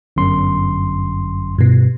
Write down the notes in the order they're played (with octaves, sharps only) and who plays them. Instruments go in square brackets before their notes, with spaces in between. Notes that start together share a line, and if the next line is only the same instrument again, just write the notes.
[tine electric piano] G1 F#2 C6
[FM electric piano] G2 B2